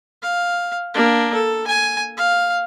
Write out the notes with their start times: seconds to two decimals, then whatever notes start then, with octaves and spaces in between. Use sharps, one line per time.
0.22 F5
0.94 A#3 D4
1.34 A4
1.67 G#5
2.17 F5